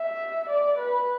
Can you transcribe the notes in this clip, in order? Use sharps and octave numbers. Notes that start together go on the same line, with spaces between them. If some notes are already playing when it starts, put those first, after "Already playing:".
Already playing: E5
D5
B4